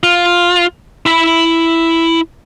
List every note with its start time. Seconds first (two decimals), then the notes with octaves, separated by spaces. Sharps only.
0.03 F4
1.06 E4 B5